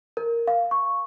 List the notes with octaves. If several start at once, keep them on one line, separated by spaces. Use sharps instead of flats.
A#4
F5
C#6